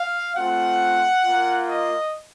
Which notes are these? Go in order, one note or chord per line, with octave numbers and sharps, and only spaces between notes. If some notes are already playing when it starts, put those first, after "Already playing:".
Already playing: F5
A3 C4 F4 F#5
A#3 F4
D#5